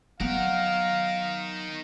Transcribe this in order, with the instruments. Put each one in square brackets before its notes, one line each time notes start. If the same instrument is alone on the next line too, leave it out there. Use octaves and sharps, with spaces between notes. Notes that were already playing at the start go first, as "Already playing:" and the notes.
[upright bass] F#3 B3 [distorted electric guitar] D#4 A#4 [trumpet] F5 [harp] F#5 F#6 B6